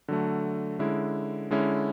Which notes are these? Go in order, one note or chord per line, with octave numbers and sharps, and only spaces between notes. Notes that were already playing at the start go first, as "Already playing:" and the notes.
D3 F#3 A3
D3 G#3 C#4 E4
D3 G#3 C#4 E4